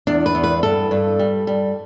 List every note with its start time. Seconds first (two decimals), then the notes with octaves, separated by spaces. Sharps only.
0.07 E2 D4
0.26 B4
0.35 E2
0.44 B4
0.63 G2 A4
0.91 G2
1.19 G3
1.47 G3